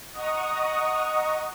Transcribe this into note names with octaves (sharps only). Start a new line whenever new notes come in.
D#5 F#5 A#5 C#6 D#6